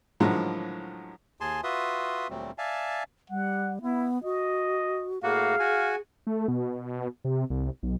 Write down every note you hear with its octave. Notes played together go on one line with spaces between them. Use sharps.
A2 D3 D#3 F3 F#3 G#3
D#2 G#4 G#5 A5 C6
F4 F#4 B4 E5 C6 D#6
D2 A#2 F#3 G3 A3 C4
D5 E5 F5 G#5 A5
G3 F#5
B3 E4
F#4 D#5
A2 A#3 F#4 G#4 F5
F#4 G#5
A3
B2
C3
C2
B1